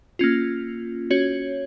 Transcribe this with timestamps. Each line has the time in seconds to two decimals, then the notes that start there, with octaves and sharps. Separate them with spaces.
0.19 A#3 C#4 F4
1.11 C#4 F#4 C#5